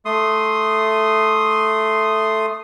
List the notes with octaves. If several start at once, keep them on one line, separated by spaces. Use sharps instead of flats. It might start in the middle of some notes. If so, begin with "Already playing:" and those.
A3 C6 D#6